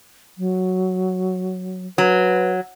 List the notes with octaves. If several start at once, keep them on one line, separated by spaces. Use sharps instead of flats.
F#3
F#3 B4